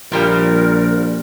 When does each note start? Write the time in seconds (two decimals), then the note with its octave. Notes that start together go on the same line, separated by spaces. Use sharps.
0.12 A#1 A#2 F3 G3 A#4